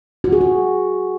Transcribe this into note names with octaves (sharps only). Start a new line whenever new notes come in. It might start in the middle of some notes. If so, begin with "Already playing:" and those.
F#4
G#4
F#4